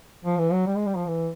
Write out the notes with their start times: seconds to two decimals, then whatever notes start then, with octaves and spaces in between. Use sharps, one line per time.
0.24 F3
0.38 E3
0.52 F#3
0.67 G3
0.77 G#3
0.86 G3
0.97 F3
1.07 E3